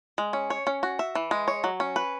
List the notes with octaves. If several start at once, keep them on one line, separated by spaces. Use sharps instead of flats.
G#3
C#4
C#5
C#4
F#4
E5
E3
G#3
C#5
F#3
C#4
B4